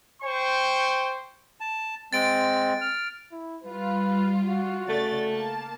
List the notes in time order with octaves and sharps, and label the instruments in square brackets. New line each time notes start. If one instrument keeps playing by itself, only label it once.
[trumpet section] C5 G5 C#6
[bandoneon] A5
[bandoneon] G#3 C4 [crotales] A6 D7
[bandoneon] F6
[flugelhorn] E4
[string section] G3 F4 [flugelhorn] B4
[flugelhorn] F#4
[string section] C#3 D5 A6 [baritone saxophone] A3
[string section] A#3 A5